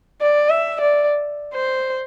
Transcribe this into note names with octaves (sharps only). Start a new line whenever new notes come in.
D5
E5
D5
C5